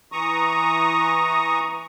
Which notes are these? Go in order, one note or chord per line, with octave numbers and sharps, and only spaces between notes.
E3 A#5 C#6 D#6